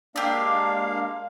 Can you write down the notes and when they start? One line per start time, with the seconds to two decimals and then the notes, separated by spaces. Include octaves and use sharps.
0.16 G#3 A#3 D4 G4 F5 E6